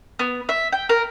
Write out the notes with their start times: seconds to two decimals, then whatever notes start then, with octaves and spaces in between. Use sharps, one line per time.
0.19 B3
0.49 E5
0.73 G5
0.89 A#4